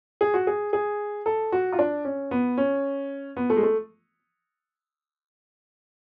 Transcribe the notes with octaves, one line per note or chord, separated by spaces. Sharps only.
G#4
F#4
G#4
G#4
A4
F#4
F4
D4
C#4
B3
C#4
B3
A3
G#3
A3